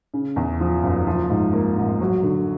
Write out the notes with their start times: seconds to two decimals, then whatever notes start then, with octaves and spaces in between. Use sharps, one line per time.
0.14 C#3
0.36 E2
0.60 F3
0.83 F#1
1.07 F3
1.29 G#2
1.53 A#3
1.77 A1
2.01 F#3
2.23 D3